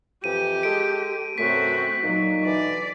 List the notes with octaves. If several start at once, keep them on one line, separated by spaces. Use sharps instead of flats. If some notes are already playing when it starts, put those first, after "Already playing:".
F2 E3 G4 D#7
G#3 A4 D7
F#2 B2 A3 C4 F#4 B6
A#2 F#3 D#4
B2 D3 E3 D5